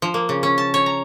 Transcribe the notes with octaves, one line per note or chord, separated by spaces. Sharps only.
F3
A#3
C#3
C#4
A5
C#5
A#5